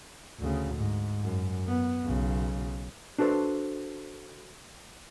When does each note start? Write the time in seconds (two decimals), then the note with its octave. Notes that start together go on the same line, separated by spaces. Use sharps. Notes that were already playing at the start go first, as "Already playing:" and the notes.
0.39 D2 C#3
0.76 G#2
1.23 F#2
1.67 B3
2.05 B1 C#3
3.18 D4 F#4 A4 B4 C5